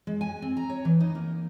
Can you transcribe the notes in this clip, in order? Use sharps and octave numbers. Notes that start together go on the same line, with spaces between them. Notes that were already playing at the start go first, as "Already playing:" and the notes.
G#3
G#5
C4
A#5
C#5
E3
D#4
A#3